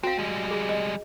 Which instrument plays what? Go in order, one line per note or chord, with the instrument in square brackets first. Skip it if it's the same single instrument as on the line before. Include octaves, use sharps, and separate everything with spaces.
[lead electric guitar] C4 [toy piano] F#4 F5
[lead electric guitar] G3 G#3
[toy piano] G#4
D#5